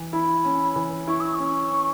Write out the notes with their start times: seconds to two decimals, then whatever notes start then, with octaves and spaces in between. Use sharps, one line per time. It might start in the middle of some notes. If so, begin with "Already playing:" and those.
Already playing: E3
0.13 E4 B5
0.45 C#4
0.76 E3
1.07 E4 C#6
1.20 E6
1.34 C#4 C#6
1.71 C#4